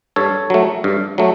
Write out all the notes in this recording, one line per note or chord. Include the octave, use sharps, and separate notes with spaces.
G2 A4 C#5
F#3 A3
G2
F#3 A3